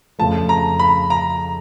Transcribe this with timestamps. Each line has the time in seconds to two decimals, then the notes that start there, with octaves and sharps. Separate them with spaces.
0.19 F2 C#3 F3 A3 A5
0.49 A#5
0.79 B5
1.10 A#5